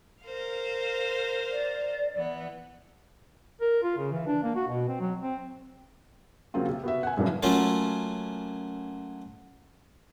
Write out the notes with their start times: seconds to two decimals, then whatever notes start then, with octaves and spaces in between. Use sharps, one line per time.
0.24 A#4 C5 F5
1.51 D5
2.14 E3 B3
3.61 A#4
3.83 F4
3.98 C#3
4.12 E3
4.27 D4
4.44 A#3
4.56 F#4
4.68 B2
4.88 C4
5.00 F#3
5.22 C4
6.54 C#3 F#3 A#3 C4 F4
6.69 C3
6.84 B3 F#4 E5
7.03 F#5 G#5
7.17 F#2 A#2 C#3 E3 F3
7.43 F#3 A3 A#3 C#4 F4